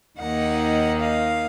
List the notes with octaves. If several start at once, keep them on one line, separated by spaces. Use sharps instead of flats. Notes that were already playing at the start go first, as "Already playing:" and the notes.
D#2 D#3 A#3 D#4 F#5
F5